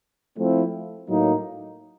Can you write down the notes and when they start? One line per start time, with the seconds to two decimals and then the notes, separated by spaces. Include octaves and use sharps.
0.38 F3 A3 C4 E4
1.09 A2 F#3 A#3 D#4